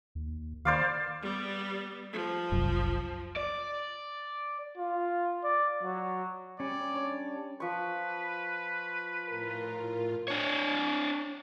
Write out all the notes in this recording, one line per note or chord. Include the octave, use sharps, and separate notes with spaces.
D#2
D#3 C5 D5 F5
G3 B3
F3
F#1 C2 F#2
D5
F4
D5
F#3
G3 C#4 D5
D4 C#5
F3 B4 C#6
A2 F4 A#4
D4 C#5